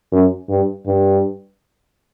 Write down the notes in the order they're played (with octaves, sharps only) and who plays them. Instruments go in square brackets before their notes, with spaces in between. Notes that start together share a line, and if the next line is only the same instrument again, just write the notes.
[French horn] F#2
G2
G2